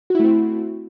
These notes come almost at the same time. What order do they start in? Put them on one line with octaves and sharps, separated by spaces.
F#4 E4 A3 C4